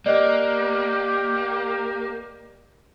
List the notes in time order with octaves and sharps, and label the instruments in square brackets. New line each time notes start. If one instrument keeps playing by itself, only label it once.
[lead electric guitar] A#3 [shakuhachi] G4 [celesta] D5 D#5 F#6